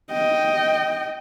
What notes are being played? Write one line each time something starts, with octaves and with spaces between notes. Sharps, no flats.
D#5 G5